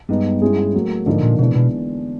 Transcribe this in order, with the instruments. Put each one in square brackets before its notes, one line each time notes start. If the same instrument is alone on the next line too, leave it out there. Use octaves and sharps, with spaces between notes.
[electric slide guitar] G2 [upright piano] G#3 B3 D#4
[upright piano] G#3 C#4 E4 G#4
A2 F#3 A#3
[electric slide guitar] G#2 [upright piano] D3 F3 A#3 D#4
[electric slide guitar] A#2
[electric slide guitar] B2 [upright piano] E3 G#3 B3 D4
[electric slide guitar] B2